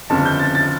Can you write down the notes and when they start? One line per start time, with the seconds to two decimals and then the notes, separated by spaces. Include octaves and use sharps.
0.10 G1 F2 C#3 A5
0.25 G6
0.40 A6
0.55 A6